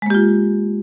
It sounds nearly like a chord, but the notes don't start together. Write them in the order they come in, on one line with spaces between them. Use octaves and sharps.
G#3 A#3 G4 F4